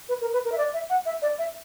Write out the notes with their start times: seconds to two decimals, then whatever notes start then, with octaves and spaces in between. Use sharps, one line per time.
0.09 B4
0.21 A#4
0.33 B4
0.45 A#4
0.52 E5
0.58 D5
0.73 E5
0.90 F#5
1.05 E5
1.22 D5
1.38 E5